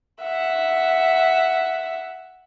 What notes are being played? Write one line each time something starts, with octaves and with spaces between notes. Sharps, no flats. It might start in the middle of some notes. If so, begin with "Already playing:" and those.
E5 F#5